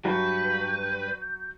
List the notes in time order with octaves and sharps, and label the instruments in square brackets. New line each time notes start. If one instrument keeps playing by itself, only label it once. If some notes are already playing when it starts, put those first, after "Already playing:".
[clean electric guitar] G2 [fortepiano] F#3 F#4 [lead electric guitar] B4 [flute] G6